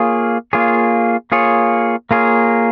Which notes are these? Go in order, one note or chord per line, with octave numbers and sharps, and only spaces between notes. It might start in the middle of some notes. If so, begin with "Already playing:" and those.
Already playing: A#3 F4 G#4 C#5
A#3 F4 G#4 C#5
A#3 F4 G#4 C#5
A#3 F4 G#4 C#5